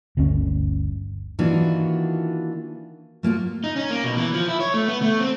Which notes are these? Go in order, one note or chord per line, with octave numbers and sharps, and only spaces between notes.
G1 D2 G2 C#4
D#3 E3 A#3 D4 F4 F#4
A3 A#3 F4 F#4
D#4
C#4
A#3
B2
E3
F3
E4
C#5
A3
B3
A3
C4